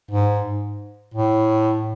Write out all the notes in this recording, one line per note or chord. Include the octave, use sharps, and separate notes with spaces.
G#2
A2